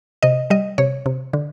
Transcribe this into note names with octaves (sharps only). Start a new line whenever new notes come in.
C3 D#5
G3 D#5
C3 C#5
C3
D3